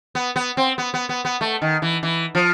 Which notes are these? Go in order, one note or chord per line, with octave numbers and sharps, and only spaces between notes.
B3
B3
C4
B3
B3
B3
B3
A3
D#3
E3
E3
F3